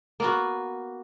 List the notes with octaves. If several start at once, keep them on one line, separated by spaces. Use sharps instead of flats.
A#3 B3 F#4